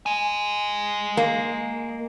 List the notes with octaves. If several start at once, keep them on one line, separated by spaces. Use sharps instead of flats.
D#5 G#5
A#3